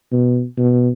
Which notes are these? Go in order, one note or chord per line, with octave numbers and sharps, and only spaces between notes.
B2
B2